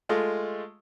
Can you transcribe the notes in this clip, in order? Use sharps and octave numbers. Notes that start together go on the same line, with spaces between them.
G#3 A3 F4